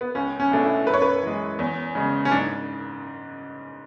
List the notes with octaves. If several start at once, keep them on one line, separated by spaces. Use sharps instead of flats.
B3
C#2 C#4
C#4
B2 A3 D4
E4
F#2 B4
C#5
B4
E3 G#3
E2
C#3 G#3
C#4
G#2 D4